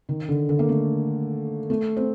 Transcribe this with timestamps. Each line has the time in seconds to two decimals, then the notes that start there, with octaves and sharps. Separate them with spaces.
0.09 D#3
0.29 D3
0.49 D3
0.59 A#3
0.69 A3
1.70 A3
1.97 C4